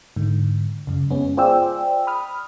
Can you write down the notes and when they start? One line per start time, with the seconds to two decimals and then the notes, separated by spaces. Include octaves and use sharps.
0.16 G#2 D3
0.87 F#2 C#3
1.11 G#3 B3 C#4
1.37 F4 G#4 C5 D5 G5 E6
2.07 B5 D#6 F6